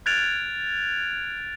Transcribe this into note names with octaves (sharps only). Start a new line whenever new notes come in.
F6 F#6 G#6 A6 D7 F7